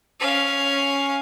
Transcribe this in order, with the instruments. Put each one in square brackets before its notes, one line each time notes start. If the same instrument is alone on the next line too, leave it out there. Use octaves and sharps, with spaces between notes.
[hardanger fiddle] C#4 F5